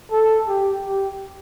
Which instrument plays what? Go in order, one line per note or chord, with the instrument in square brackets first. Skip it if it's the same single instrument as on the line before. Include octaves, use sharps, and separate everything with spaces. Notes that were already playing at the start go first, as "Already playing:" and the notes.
[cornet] A4
G4
G4